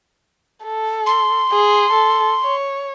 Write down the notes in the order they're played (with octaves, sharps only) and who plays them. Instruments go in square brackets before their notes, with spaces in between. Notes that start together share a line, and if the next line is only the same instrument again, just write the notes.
[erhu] A4
[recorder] C6
[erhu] G#4
A4
C#5